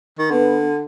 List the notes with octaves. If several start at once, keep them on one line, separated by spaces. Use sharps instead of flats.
D#3
D3 B3